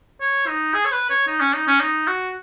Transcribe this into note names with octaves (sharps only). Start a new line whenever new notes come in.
C#5
D#4
G#4
C#5
B4
C#5
D#4
C#4
D#4
C#4
D#4
F#4